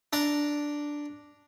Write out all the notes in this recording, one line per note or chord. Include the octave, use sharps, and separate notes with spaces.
D4 D5 A#5